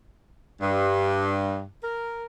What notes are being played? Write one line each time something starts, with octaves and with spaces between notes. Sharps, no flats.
G2
A#4